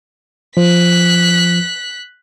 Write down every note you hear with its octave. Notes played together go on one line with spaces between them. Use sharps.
F3 F#6 B6